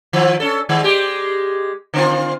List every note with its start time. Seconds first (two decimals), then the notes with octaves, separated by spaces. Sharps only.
0.13 D#3 F3
0.40 C#4 A4
0.69 D#3 G#3
0.83 G#3 G4
1.94 D3 C4 F4